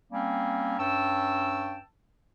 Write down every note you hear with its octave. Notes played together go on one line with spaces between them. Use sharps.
G3 A#3 C4 C#4
G2 C#4 G5 A5 E6